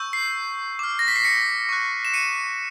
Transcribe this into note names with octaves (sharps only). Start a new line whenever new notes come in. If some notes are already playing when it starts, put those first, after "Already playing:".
Already playing: C#6 E6 G6
C7
D6 F6
A#6
B6
C7
B6 C#7
C#6 F#6
E7
C#7 D#7